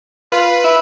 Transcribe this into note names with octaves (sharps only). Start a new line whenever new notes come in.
F4 B4
E4